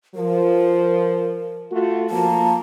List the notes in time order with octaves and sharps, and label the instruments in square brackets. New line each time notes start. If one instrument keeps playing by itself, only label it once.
[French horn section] F3 [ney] A#4
[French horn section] A3 F4 F#4
[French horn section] F3 A#3 [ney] A5